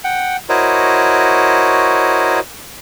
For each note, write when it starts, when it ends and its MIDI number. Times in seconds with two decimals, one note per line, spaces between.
0.04 0.37 78
0.04 0.37 79
0.49 2.40 64
0.49 2.40 66
0.49 2.40 70
0.49 2.40 72
0.49 2.40 73
0.49 2.40 75